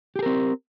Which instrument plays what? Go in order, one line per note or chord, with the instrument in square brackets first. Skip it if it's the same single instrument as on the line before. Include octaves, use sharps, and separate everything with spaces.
[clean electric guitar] G4
G#4
A#4
C4